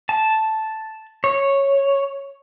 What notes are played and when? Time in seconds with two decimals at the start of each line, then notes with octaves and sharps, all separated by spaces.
0.09 A5
1.24 C#5